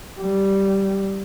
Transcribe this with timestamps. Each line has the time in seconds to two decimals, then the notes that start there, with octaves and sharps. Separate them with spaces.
0.20 G3